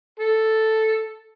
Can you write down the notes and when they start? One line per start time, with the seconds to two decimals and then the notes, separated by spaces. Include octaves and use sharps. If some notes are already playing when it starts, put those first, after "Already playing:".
0.20 A4